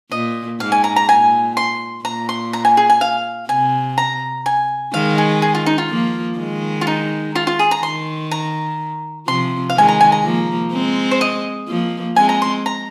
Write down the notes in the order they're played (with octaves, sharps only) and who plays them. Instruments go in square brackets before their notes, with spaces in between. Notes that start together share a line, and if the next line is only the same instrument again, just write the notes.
[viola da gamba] A#2 [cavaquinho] D#5
[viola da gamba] G#2 [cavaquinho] F5
[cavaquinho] G#5
A#5
A#5
[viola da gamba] A#2 [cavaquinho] G#5
[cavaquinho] C6
[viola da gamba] A#2 [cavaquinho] A#5
[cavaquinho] C6
A#5
G#5
G#4
G#5
F5
[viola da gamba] C3 [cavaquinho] G#5
[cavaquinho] A#5
G#5
[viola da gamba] D#3 G#3 [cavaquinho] F5
[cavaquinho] G#4
G#4
F4
D#4
F4
[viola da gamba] F3 A#3
D#3 G#3
[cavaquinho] F4
D#4
F4
F4
G#4
A#5
[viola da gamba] D#3 [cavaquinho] C6
[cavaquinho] A#5
[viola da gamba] C3 F3 [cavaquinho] C6
[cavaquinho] F5
[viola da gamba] D#3 G#3 [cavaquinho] G#5
[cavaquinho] A#5
G#5
A#5
[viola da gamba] F3 A#3
G#3 C4
[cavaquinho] C5
D#5
[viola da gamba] F3 A#3
[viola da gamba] G#3 C4 [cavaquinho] G#5
[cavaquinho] A#5
C6
A#5